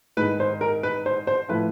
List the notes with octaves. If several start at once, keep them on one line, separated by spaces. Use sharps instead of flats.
G#2 B4
D#3
C5
A#4
B4
C5
C5
A2 F3 B4